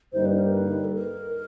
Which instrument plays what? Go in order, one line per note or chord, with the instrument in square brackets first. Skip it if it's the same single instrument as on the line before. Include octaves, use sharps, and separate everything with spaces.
[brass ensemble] G2 D3 G3 A#3 D#4 [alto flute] C5
[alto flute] B4
A#4
B4
A4
A#4